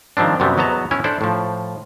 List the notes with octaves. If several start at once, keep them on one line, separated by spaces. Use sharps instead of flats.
D#3 F3 G3 C4 D4
F#2 C3 F#3 G3 B3
E2 F#3 B3 D#5 A5 A#5
E3 C#4 E4 C#5
D4 E4 A4 C5 D5
A2 F3